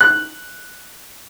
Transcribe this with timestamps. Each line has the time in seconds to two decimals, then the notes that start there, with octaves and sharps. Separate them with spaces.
0.01 F#6